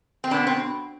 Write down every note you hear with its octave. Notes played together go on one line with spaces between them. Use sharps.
C4
B2 B3 D4
C4